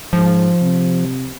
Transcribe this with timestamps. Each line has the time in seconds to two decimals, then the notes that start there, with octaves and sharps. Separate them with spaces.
0.13 G#2 F3
0.62 C3